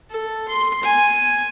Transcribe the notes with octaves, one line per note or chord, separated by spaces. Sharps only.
A4
C6
G#5